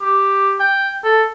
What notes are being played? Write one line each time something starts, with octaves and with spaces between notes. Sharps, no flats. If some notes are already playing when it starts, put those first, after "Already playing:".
G4
G5
A4